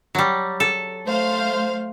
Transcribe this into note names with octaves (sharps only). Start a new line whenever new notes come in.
F#3 G3
A4
A3 C5 F5